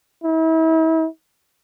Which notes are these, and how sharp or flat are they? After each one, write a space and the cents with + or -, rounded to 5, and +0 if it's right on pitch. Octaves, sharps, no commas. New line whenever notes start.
E4 -40